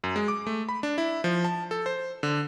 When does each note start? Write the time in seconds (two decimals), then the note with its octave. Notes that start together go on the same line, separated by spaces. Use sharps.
0.04 F#2
0.16 G#3
0.28 D6
0.47 A3
0.69 B5
0.83 D4
0.98 E4
1.24 F3
1.45 A5
1.71 A4
1.86 C5
2.23 D3